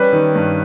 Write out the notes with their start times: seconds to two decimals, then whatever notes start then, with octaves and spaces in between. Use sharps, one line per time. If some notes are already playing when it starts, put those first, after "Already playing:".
Already playing: G3 C#4 B4
0.13 D#3
0.36 G2